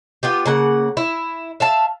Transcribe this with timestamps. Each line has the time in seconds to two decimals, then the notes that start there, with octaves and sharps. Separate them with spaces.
0.23 B3 F4 G4
0.46 C#3 A#3 F#5
0.97 E4
1.60 E5 F5 A5